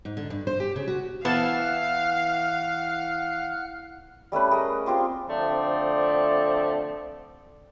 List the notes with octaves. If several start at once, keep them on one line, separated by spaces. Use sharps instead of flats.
G#2
D3
G2
C5
G4
C#3
F#4
E3 B3 F5 F#5 A5 F6 F#6 E7
G3 A3 C#4 B4
G#4 A#4 D#5
C4 F4 G4 C6
D3 F3 A3 C4 D5